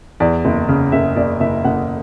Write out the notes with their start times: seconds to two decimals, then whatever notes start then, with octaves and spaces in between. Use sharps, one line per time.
0.20 E2 D5
0.45 F#1
0.69 C#3
0.92 F#1 E5
1.16 F#1 D5
1.40 F#1 E5
1.64 F#1 F#5